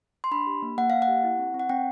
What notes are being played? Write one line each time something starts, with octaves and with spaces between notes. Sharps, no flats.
C6
D4 B5
G4
A#3
A#3 F#5
A#3 F5
F#5
G4
E4
C4
C4
F#5
C4 G5